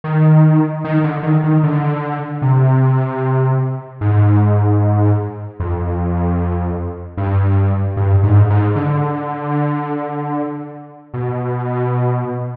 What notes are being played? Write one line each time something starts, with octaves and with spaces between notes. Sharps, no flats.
D#3
D#3
D3
D#3
D#3
D3
C3
G#2
F2
G2
G2
G#2
G#2
D3
B2